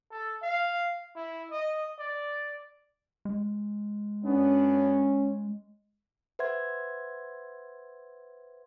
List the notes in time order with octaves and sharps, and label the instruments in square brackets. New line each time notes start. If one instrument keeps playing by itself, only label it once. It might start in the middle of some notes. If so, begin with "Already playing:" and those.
[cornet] A4
F5
E4
D#5
D5
[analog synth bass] G#3
[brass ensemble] F#2 B3 D4 [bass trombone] C#4
[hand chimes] B4 C5 E5 F#5 C6 G#6